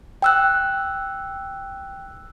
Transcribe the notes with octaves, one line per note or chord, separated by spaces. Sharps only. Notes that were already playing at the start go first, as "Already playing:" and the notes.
G5 E6 F#6